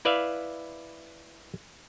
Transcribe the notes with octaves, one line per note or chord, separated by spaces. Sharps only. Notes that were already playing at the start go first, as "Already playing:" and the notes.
E4 B4 D5 E5 F5